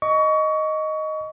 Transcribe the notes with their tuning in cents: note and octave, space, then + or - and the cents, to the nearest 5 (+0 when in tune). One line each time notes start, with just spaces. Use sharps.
D#5 +0 C#6 +25